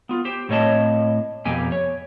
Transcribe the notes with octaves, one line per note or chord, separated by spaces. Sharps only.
B3 F4
G4 C5 G5
A2 A#3 C4 C#5 D#5 A5
F2 B2 A#3 G4 G5 G#5
C#5